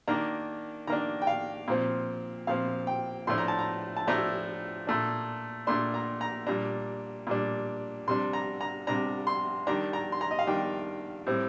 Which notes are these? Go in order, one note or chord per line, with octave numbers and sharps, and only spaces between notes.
D#3 A#3 D4 A#5
D#3 A#3 D4 A#5
G5
F5
A#2 F3 C4
A#2 F3 C4 F5
G5
A2 F3 A3 D4 C6
A#5
A5
A#5
A5
A2 F3 A3 D4 A#5
A#2 A3 D4
A#2 A3 D4 C6
A#5
A#5
A#2 G3 D4 A#5
A#2 G3 D4
C3 G3 D4 C6
A#5
A#5
C3 G3 D4 A#5
C6
D#3 G3 D4 A#5
A#5
C6
A#5
D#5
F5
D#3 G3 D4 G5
A2 G3 C4